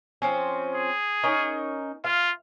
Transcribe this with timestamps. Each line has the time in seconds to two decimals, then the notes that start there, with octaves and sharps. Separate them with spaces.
0.22 F3 C4 C#4
0.75 G#4
1.23 C#4 D#4 A#4
2.04 F4 F5